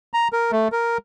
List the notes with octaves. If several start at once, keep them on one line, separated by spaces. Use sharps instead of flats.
A#5
A#4
A3
A#4